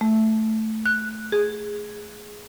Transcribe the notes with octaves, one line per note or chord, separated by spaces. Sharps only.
A3
F#6
G#4